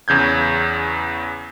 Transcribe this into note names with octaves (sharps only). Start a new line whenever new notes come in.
E2 C#3 G6 G#6